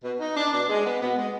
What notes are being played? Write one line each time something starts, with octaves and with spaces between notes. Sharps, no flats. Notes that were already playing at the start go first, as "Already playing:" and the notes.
B2
D#4
D4
B2 D4
G#3
B3
B2 B3
G#3